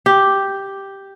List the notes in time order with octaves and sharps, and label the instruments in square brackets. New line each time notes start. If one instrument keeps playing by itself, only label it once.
[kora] G4